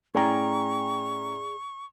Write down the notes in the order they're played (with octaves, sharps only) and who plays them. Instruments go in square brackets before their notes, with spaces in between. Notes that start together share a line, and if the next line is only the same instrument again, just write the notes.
[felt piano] A2 C#4 A#5 [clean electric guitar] G#4 D5 G5 [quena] C#6